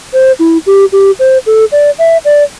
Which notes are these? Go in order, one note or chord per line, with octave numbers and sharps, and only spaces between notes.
C5
E4
G4
G4
C5
A4
D5
E5
D5